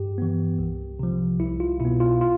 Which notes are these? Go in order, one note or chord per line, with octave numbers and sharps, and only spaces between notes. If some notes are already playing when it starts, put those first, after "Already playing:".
Already playing: G2 G4
E3 B3
C2
C3 F3
C2 E4
F4
B2 B3 E4
F4
F4